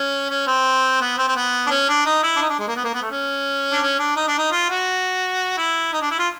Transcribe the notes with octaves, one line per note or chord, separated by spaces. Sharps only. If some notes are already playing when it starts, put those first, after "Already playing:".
Already playing: C#4
C#4
C4
B3
C4
C4
B3
D4
C#4
D4
D#4
E4
D4
D#4
D4
G#3
A#3
B3
A#3
B3
A3
C#4
D4
C#4
D4
D#4
D4
D#4
F4
F#4
E4
D#4
D4
E4
F4